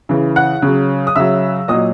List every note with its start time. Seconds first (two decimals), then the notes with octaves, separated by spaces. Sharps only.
0.09 C#3 E3
0.36 F#5 F#6
0.62 C#3 F#3
1.07 D#6
1.16 C#3 F#3 E5 E6
1.68 A#2 F#3 D#5 D#6